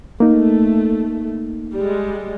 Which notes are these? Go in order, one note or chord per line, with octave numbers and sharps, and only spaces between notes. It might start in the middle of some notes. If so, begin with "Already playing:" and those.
A3 A#3 D#4
G3 G#3